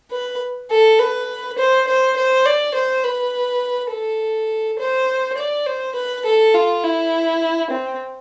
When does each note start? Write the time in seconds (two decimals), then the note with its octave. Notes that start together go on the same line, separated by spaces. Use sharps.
0.11 B4
0.71 A4
0.99 B4
1.58 C5
1.87 C5
2.17 C5
2.46 D5
2.74 C5
3.03 B4
3.92 A4
4.79 C5
5.37 D5
5.66 C5
5.95 B4
6.25 A4
6.54 F4
6.83 E4
7.70 C4